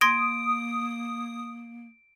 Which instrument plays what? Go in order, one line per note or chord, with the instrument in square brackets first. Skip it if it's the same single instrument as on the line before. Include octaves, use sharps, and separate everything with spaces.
[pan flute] A#3 [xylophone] C6 G#6 A#6 [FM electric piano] D#6 [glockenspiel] D7